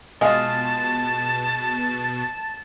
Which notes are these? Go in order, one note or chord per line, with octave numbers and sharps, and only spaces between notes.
B2 G#3 F4 A5 A6